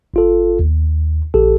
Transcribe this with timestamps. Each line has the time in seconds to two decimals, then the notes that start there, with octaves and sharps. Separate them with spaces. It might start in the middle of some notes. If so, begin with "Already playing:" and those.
0.14 G1 F4 A4
0.59 D#2
1.34 A#1 G4 A4